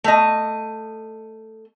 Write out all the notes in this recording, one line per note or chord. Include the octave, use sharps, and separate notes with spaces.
A3 D#5